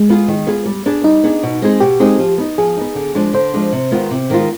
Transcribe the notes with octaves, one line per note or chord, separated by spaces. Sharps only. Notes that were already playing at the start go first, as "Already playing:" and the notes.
Already playing: G#3
B3 F4 G#4
D#3
B3 F4 G#4
G3
B3 D4 G#4
G3 D#4
B3 D4 G#4
B2
G#3 C4 D#4 G#4
B2 G4
G#3 C4 D#4 G#4
F3
B3 D#4
F3 G#4
B3 D#4
D3
F3 G#3 D4
D3 C5
F3 G#3 D4
C3
D#3 G#3 B3 F4
C3
D#3 G#3 B3 F4